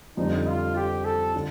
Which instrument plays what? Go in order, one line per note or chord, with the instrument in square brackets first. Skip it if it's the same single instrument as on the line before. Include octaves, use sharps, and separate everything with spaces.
[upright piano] F2 D3 G3 [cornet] D#4
[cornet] F4
G4
A4
[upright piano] D3